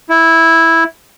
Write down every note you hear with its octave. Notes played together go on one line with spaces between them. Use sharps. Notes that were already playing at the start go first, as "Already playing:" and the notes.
E4